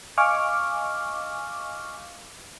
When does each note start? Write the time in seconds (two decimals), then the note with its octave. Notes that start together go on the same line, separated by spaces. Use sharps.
0.18 D#5 F5 G#5 C#6 D6 F6